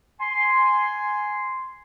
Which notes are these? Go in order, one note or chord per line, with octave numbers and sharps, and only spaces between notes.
G#5 C6